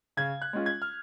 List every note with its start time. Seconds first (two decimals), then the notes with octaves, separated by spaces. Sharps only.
0.17 C#3 G#6
0.42 F#6
0.53 G#3 C#4 F4
0.66 G#6
0.82 F6